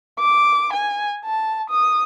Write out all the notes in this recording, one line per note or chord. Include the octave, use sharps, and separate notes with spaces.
D6
G#5
A5
D#6